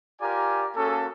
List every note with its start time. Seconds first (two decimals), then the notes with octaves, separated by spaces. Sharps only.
0.21 F4 G4 A#4 D5 G#5 A#5
0.76 A#3 C#4 F#4 G#4 A4